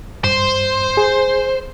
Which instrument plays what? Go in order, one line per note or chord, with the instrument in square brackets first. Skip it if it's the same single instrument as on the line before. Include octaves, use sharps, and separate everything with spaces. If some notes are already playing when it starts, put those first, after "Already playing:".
[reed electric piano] G2 [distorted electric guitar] C5
[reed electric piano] G#4